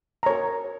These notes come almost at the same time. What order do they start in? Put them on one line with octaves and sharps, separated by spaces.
A#5 C#5 A#4